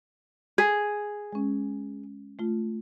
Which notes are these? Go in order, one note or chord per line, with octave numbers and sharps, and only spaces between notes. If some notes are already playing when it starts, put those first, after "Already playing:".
G#4
G#3 C#4
A3 F4